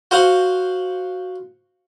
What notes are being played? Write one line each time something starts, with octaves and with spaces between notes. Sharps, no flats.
F#4 C5 F5 F#5